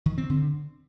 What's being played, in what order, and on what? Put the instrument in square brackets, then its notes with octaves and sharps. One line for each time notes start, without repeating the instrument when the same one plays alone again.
[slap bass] D#3
C4
D3